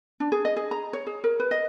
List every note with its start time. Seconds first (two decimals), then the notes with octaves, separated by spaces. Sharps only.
0.20 D4
0.32 G#4
0.45 D#5
0.56 G#4
0.71 A#5
0.93 C#5
1.07 G#4
1.24 A#4
1.40 B4
1.51 D#5